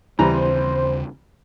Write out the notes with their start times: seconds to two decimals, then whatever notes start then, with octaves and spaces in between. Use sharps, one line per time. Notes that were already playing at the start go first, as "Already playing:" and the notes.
0.19 D#2 C#3 E3 G3 C4 C5 A#5